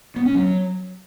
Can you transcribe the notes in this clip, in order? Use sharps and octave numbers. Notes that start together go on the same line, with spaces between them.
B3
C#4
F#3